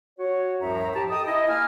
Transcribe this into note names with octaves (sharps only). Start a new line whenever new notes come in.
F#4 C#5
C2 F#2 A2 F3 E5 A#5
G4 A5 A#5
A4 D#5 G5 A5 D#6
E4 D#5
A#3 G#5 F6